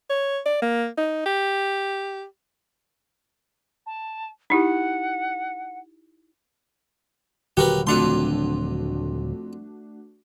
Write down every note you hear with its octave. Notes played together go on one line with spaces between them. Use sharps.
C#5
D5
A#3
D#4
G4
A5
D#4 E4 G4 F#5
D#1 D3 F#3 F#4 G4 A#4 B4
F2 A3 D4 F4 F#4 C6